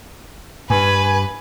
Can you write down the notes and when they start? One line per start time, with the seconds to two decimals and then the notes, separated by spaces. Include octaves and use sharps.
0.70 G2 B4 G#5